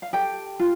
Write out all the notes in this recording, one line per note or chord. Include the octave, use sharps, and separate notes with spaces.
F5
G4 A4 G5
F4